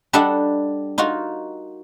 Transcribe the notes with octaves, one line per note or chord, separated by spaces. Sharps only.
G3 D4 G4 A4 D#5 F#5
D#4 F4 F#4 A#4